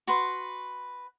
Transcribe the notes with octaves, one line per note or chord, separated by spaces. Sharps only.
F#4 B4 C6